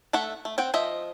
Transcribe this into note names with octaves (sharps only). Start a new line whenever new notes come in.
A3 A4 E5 F#5
A3
C4 F#5 G5
F3 C5 D#5 E5